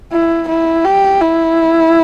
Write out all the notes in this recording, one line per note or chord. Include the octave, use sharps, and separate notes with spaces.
E4
E4
G4
E4